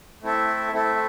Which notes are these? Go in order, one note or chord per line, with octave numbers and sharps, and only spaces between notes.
A3 C4 E4 A4 E5
A3 C4 E4 A4 E5